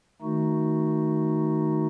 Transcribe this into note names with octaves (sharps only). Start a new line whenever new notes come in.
D#3 A3 D#4 F#4